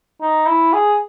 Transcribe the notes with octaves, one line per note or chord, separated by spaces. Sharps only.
D#4
E4
G#4